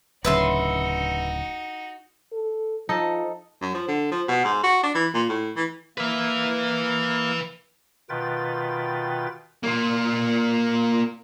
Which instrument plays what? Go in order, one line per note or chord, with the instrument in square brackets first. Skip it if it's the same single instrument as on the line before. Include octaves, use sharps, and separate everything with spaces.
[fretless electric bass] D1 C#3 [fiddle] D#4 F#4 [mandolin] B4 E5 C6
[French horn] A4
[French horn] F3 [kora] D#4 A4
[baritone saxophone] F#2
F3
D3
F3
B2
G#2
F#4
D4
E3
A#2
A2
E3
[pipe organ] A#3 [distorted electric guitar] B4 E5
[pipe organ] B2 D#3 F4 B4 G5 A6
[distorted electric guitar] A#3 F4